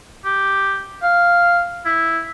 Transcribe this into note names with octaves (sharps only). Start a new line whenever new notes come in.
G4
F5
E4